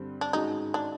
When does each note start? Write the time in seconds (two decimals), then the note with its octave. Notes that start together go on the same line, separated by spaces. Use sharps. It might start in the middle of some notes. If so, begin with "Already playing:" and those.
Already playing: G2 D3 G3 C4
0.21 D4
0.33 G#2 D#3 G#3 C#4 D#4 F#4
0.74 D4